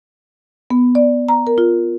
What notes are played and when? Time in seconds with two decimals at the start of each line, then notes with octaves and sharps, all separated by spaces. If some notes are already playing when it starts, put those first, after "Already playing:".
0.70 B3
0.95 D5
1.29 A#5
1.47 A#4
1.58 F4